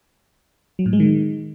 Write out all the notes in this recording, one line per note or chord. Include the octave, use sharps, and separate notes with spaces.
F#3
A2
G#3
D#3